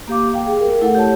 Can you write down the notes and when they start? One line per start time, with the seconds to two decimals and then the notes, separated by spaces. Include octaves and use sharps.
0.08 A#3 G4 F5 D6
0.34 F5 G5
0.46 G#4
0.61 A#4
0.81 A3 E4 A4 F#5
0.95 G4 C#5 A5